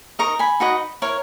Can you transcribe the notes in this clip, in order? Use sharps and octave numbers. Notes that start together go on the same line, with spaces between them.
D#4 A#4 D#5 A#5 C#6
G#5 B5
D#4 F#4 B4 D#5
E4 A#4 C#5